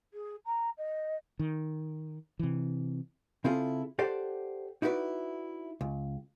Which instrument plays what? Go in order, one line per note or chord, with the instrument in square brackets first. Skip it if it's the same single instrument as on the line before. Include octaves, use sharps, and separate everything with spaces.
[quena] G#4
A#5
D#5
[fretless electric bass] D#3
C3 E3
[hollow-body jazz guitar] C#3 C4 E4 F4 G#4 A4
G4 A4 C5 D5 F#5
D#4 E4 F#4 G4 B4 D5
C#2